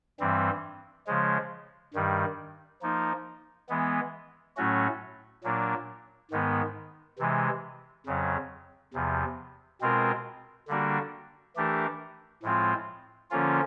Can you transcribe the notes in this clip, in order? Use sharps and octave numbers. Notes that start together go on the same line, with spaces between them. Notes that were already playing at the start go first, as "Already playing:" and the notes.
G2 E3 G3 C4
C#3 F3 G#3
G2 D#3 G3
F3 A#3 D#4
E3 G#3 B3
A2 F#3 A3 C#4 F#4
A#2 F#3 A#3 D4
G#2 D#3 G#3 B3
C3 E3 G#3
F2 C#3 F#3
E2 C3 F3
B2 G#3 C4 F4 A#4
D3 G3 A#3 D4 F#4
E3 A3 D4 G4 A#4
A2 F3 G#3 C4 F4
D3 F3 A#3 C#4 F4